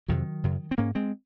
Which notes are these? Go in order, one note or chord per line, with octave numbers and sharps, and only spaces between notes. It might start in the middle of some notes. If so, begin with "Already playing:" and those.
F2 C3 D#3 F#3
F#2 C#3
C4
G#2 A#3 C#4
G#3 C4